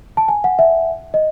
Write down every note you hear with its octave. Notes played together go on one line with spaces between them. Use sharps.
A5
G#5
F#5
E5
D#5